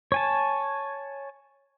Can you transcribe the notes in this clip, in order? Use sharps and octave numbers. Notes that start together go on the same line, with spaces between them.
C#5 G#5 A5